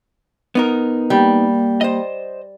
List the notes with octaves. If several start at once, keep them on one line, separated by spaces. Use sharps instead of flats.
B3 D#4 A#4
G3 A#3
C5 D#5